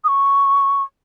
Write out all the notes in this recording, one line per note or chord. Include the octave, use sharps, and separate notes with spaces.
D#6
C#6